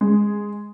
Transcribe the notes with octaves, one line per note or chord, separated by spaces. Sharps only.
G#3